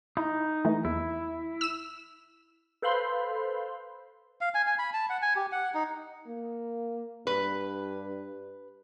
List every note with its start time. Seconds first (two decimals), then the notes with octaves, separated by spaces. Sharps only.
0.17 D#4 E4
0.65 E3 A3
0.85 E2 E4
1.61 E6 E7
2.82 A4 B4 C5 F5 B5 C6
4.41 F5
4.54 G#5
4.67 G#5
4.79 B5
4.94 A5
5.10 F#5
5.22 G#5
5.36 G4
5.52 F#5
5.74 D#4
6.28 A#3
7.27 G2 B4